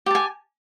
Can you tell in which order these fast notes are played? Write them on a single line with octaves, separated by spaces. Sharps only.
G4 A5 G#5